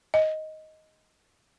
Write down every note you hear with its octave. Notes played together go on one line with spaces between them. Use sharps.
D#5